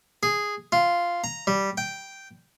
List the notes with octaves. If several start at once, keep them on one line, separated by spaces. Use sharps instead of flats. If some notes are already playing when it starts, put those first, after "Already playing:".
G#4
F4
A#5
G3
G5